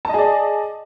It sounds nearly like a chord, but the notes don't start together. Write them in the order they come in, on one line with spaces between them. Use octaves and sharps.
A5 D#5 G#4 D5